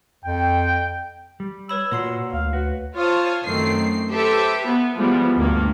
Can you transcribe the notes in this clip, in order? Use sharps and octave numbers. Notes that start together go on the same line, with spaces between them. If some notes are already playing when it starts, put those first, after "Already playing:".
F2 G5
G3
B4 C#5 B5 E6
A#2 A#3 F#4 C#5 C6 C7
D2 F5
F#4 B4
F4 C5 C#5 F5 A5 D#6
F#2 D#3 A3 C4 C7
G4 A4 B4 C5 E5
B3
E3 F3 G3 G#3 B3
D2 G2 A#3